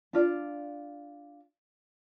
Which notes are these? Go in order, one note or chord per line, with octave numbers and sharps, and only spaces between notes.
D4 F4 D5